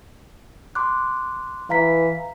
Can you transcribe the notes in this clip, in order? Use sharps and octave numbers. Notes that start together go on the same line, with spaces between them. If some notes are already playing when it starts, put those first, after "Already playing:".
C6 D6 F#6
E3 F5 A#5 B6